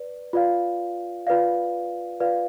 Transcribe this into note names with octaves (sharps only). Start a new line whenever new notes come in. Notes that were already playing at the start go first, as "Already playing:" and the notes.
Already playing: B4 D5
F4 B4 D5 F5
F4 B4 D5 F5
F4 B4 D5 F5